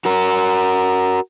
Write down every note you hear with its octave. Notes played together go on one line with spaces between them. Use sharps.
F#4 A#4